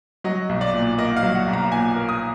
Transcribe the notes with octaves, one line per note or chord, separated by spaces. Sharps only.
F#3 D#5
B1
D5
A#2
A#3 D#5
F5
F#3
F#5
B1
A#5
A#2 G#5
A#3
D#6